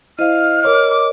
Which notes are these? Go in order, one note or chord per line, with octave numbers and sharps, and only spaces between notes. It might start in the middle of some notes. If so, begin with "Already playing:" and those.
E4 C5 D#5 F5 F6
A#4 C#5 D6